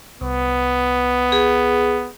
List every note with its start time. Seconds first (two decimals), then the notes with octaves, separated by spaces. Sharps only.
0.21 C2 B3
1.32 G#4